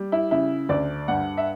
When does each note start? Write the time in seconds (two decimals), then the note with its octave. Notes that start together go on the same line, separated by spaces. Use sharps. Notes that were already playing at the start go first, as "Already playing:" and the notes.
Already playing: G3
0.12 E4
0.31 C#3 E4
0.69 D2 D5
1.08 G2 F#5
1.37 E5